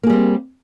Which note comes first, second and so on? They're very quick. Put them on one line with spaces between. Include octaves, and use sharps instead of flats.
A#3 G#4 G3 C4